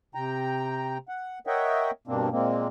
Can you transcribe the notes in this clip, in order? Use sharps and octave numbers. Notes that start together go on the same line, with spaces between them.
C3 G5 A#5
F#5
A#4 C#5 D#5 E5 F#5 G5
G2 B2 A#3 C4 D4
A#2 G#3 A#3 C4